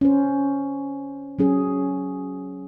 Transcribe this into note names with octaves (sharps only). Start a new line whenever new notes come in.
C#4 C5
F#3 C#4 G#4